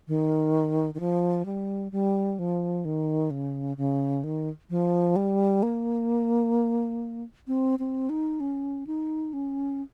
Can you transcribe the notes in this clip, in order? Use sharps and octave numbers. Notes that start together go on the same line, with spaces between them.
D#3
D#3
F3
G3
G3
F3
D#3
C#3
C#3
D#3
F3
G3
A#3
C4
C4
D#4
C#4
D#4
C#4